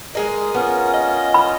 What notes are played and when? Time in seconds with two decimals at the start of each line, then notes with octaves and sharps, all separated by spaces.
0.15 G#3 G#4 A#4 D#5
0.55 B3 C#4 F4
0.93 D#5
1.34 B5